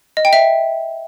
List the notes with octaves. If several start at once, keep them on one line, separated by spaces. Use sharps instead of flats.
D#5
G5
E5